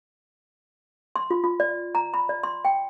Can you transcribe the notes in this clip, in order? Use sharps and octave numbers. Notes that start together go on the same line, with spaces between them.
C6
F4
F4
D5
A#5
B5
D5
C6
G5